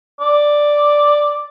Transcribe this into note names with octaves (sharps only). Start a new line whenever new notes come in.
D5